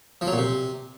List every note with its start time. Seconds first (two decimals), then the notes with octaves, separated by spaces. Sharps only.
0.21 F3
0.27 F#3
0.33 A#2
0.38 C3